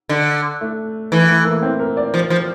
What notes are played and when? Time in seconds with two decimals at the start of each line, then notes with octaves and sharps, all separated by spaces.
0.09 D3
0.61 A3
1.12 E3 A3
1.29 A3
1.45 A#3
1.62 C4
1.79 A#4
1.97 D5
2.14 F3
2.30 F3